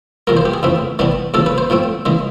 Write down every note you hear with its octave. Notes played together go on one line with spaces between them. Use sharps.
E2 C3 F3 A#3 A#4
C5
G4
G#4
F2 C#3 E3 A3 C4
C3 E3 G3 B3 D4
E2 C#3 F3 A4
B4
C5
A2 F3 A3 C4
C#3 E3 G#3